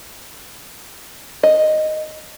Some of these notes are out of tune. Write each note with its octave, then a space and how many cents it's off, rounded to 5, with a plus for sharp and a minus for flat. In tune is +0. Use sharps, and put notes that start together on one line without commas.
D#5 -5